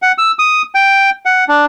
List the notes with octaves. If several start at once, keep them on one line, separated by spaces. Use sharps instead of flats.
F#5
E6
D#6
G5
F#5
D4